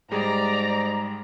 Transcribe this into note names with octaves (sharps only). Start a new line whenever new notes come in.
G#2 G3 G#3 G#4 D5 A#5